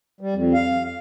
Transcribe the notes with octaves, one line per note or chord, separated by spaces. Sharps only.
G3
F2
F5